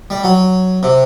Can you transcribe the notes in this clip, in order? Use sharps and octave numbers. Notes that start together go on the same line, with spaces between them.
G3
F#3
C3